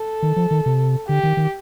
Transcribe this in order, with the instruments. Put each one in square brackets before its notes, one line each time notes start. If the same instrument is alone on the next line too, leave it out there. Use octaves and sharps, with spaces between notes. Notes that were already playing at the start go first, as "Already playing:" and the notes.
Already playing: [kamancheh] A4
[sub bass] D#3
F3
D#3
C3
[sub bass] D3 [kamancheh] G4
[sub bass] D#3
D#3